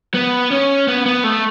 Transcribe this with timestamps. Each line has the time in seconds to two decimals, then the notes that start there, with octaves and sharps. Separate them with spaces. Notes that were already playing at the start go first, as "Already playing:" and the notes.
0.14 B3
0.51 C#4
0.88 B3
1.06 B3
1.24 A3